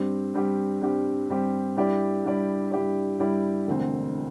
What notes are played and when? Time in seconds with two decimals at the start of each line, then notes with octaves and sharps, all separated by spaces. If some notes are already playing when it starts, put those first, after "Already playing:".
Already playing: G2 G3 C4 G4
0.34 G2 G3 C4 G4
0.82 G2 G3 C4 G4
1.29 G2 G3 C4 G4
1.77 G2 G3 E4 G4 D5
2.24 G2 G3 E4 G4 D5
2.71 G2 G3 E4 G4 D5
3.19 G2 G3 E4 G4 D5
3.67 E1 D2 D3 C4